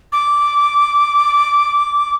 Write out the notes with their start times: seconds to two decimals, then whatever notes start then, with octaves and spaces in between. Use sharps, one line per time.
0.12 D6